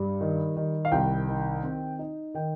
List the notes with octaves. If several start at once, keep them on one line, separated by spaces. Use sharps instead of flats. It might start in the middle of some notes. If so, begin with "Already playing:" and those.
Already playing: G2 G3
D#3
D#3
F5
C2 G5
D#3
C4
D#4
D#3 G5